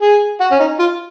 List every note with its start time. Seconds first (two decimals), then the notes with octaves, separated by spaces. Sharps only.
0.02 G#4
0.40 F#4
0.52 C#4
0.59 D#4
0.79 F4